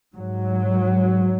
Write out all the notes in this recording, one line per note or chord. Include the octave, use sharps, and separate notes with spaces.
G#2 F#3